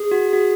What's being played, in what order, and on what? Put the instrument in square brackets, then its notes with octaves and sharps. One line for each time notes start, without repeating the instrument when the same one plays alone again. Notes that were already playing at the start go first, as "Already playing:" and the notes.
Already playing: [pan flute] G#4
[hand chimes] F#4
F#4